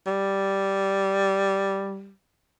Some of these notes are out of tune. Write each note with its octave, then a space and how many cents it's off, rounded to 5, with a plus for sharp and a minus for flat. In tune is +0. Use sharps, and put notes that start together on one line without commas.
G3 -5